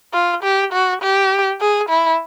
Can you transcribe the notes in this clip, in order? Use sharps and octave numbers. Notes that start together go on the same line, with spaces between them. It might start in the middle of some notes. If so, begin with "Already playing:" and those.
F4
G4
F#4
G4
G#4
E4